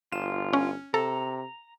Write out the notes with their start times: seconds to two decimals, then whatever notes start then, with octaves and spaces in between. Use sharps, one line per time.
0.12 G1 F4 E7
0.53 C#4
0.94 C3 A4 A#5